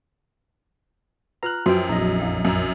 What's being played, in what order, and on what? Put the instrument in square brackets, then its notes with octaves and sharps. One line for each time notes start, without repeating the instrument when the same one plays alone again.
[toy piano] F4 B4 F#5 [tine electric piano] A#5 F6 F#6
[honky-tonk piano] F#2 [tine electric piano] F3 G5 [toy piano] F#4 B4
[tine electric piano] A#1 F2 D#5 [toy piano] E4
[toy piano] E4 F5 G5
[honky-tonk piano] F#2 [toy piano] G#5 A#5